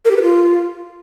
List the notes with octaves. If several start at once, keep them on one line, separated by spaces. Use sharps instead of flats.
A#4
G4
B4
F4